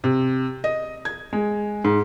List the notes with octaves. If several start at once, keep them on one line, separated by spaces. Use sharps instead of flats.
C3
D#5
G#6
G#3
G#2